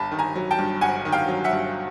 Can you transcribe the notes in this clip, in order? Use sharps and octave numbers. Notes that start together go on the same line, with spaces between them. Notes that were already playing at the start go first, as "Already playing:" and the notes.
Already playing: G1 A5 B5
D#3
G#5 A#5
F#3
G5 A5
G2
G1 F#5 G#5
D#3
F5 G5
F#3
E5 F#5
G2